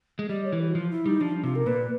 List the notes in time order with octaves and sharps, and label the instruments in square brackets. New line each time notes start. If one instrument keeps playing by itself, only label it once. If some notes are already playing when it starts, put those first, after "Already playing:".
[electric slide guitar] G#3
[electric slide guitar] G3 [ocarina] D#5
[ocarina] C#5
[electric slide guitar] E3
[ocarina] G4
F#4
[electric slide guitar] F3 [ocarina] F4
[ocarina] E4
[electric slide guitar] G3 [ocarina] D#4
[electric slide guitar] F3 [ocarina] D4
[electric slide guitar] C3 [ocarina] F4
[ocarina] A#4
[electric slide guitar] A#2 [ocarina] B4